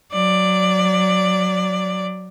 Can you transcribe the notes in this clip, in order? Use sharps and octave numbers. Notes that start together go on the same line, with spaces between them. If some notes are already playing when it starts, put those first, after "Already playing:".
F#3 D5